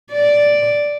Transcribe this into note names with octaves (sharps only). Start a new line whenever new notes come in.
D5